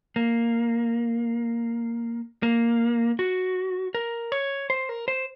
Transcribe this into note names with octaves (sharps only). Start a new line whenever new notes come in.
A#3
A#3
F#4
A#4
C#5
C5
A#4
C5